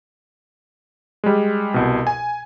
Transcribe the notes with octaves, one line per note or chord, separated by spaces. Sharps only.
G3 G#3
C2 B2
G#5